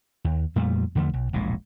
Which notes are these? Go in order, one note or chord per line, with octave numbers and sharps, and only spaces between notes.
D#2
F2 A#2 G3 A3
E2 D3 F3 A3
B1
E1 A#1 A2 G#3